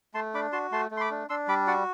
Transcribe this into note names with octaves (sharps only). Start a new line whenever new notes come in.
A3 A5 C6
D4 B5 D6
F#4 A5 C6
A3 A5 C6
A3
C6
B5 D6
D4
D4 C6 E6
G3 B5 D6
F#4 D5 F#5